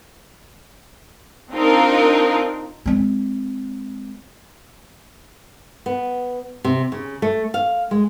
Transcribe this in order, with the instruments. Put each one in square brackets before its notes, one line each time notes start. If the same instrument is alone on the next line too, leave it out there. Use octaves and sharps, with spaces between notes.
[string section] C4 D4 D#4 F4 A#4
[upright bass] G#3 C4
[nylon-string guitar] B3
C3
C#3
A3
F5
G#3